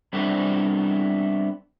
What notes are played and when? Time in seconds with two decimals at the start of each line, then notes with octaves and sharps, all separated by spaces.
0.13 G3 B3 C4 D4 E4 A4